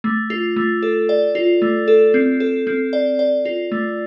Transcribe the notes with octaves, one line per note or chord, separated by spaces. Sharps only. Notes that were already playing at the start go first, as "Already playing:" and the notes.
A3
F4
A3
A4
D5
F4
A3
A4
C4
A4
C4
D5
D5
F4
A3